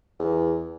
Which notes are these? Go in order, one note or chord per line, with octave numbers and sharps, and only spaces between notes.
E2